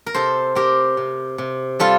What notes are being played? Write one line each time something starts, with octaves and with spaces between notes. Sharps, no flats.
A#4
C3 A4 C5
C4 G4 A#4
C3
C3
G3 F4 A4